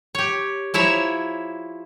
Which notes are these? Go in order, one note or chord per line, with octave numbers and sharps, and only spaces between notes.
G4 C#5
F3 E4 C#5 E5 A#5